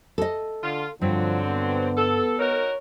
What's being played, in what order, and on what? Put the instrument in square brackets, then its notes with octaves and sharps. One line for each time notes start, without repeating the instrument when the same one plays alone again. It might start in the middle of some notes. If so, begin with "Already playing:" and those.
[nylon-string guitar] A4 D#5
[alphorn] D3 [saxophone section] F4
[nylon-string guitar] G2 [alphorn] D3 [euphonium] F3 [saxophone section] F#3 C4
[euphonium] B3
[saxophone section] A4
[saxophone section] D#4 F#4 A#4 [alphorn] C#5